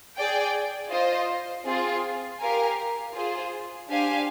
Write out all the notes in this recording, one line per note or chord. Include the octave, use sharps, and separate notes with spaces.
G#4 D5 G5
F4 C5 D#5
C4 F4 G#4
G4 A#4 F5 G#5
F4 G#4 C5
D4 G4 C5 F5 G#5